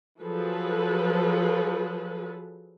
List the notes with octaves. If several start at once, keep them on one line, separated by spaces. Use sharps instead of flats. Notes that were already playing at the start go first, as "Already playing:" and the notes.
F3 F#3 G#4 A4 B4